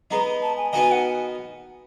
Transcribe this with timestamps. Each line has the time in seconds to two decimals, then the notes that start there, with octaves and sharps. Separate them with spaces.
0.11 G#3 B3 D#4 A#5
0.42 A5
0.57 G#5
0.72 B3 D#4 F#4 A#4 D#5 G#5
0.91 F#5